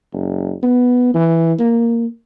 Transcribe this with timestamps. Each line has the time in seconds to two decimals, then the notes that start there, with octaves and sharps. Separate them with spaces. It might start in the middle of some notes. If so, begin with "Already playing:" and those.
0.13 F#1
0.63 B3
1.15 E3
1.60 A#3